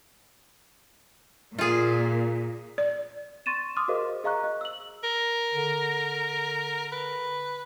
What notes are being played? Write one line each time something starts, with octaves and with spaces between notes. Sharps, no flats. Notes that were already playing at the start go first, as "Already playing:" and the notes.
A#2 F4 G#4
D5
C6 C#6 A6 D#7 E7
C6 D6 D#6 F6
F#4 G#4 A#4 C5 D#5 F5
G#4 D#5 F5 A#5 C#6 F#6
D#5
E6 F#7
A#4
D3
B4